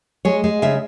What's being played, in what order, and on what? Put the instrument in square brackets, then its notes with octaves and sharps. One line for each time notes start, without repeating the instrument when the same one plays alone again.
[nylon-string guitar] G#3 C#5
G#3
C#3 E5